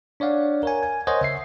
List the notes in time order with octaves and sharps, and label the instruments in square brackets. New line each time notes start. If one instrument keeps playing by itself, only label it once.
[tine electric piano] D4 C#5 D5 F5 F#5
A#4 C#5 G#5
G#5
A#4 C5 C#5 D#5 F#5 G#5
C#3 E5 C7